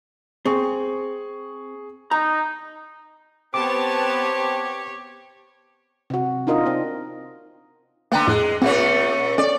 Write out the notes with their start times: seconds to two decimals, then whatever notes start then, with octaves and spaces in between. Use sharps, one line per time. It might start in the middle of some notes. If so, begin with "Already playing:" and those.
0.45 C4 G#4 C#6
2.11 D#4 A#5
3.54 B3 C4 G4 C#5 A5 D6
6.10 C3 F#4
6.47 D4 D#4 F4 A#4 D#5
6.66 C4 D#4
8.12 D3 A#3 B3 G5 A#5
8.27 F2 A2 G#3
8.62 A#2 A3 C4 C#4
9.38 C#4 A4 D5 D#5